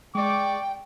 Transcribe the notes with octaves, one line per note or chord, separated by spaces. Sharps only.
G#3 D5 G5 C#6 D6